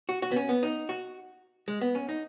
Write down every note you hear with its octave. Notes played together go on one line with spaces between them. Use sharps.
F#4
F#4
B3
C#4
B3
D#4
F#4
G#3
B3
C#4
D#4